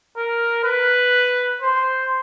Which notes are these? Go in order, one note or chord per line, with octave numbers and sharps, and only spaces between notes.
A#4
B4
C5